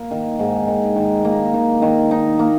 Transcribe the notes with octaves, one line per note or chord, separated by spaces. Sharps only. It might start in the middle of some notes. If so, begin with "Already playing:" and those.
Already playing: A#3
D#3
G#2
D#3
D#3
A#3
D#3
D#3
D#4
A#3